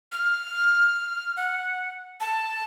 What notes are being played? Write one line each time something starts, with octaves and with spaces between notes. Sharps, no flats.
F6
F#5
A5